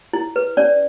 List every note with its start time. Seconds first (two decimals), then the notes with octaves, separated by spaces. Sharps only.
0.13 E4
0.36 B4
0.57 C#4 D5